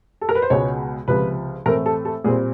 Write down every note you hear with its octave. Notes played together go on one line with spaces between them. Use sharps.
A4
A#4
B4
C5
C#2 B2 G#3 B3 C#5
C#2 C3 F3 B4
A2 E3 A3 C4 A#4
A4
A4
A#2 G3 C4 G#4